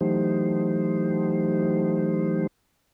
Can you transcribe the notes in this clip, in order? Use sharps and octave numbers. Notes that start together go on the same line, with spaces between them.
E3 F#3 A3 D#4 G4 C5